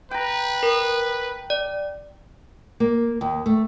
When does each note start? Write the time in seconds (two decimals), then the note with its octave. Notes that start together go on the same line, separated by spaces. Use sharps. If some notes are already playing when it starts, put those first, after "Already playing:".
0.11 B4 G5 A#5
0.63 A#4
1.50 D5
2.80 A#3
3.21 D#2
3.46 A3